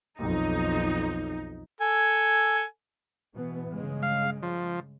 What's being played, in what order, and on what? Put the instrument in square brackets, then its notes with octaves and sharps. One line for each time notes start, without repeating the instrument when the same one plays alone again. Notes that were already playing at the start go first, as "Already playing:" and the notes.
[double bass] B1 F2 [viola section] D#4
[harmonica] A4 G#5
[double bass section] B2 E3 B3
G2 C#3 G#3
[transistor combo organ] F5
F3